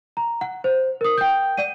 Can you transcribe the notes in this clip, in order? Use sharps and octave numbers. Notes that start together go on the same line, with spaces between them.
A#5
F#5
C5
A#4 D#6
G5 G6
D5 F#5 D#7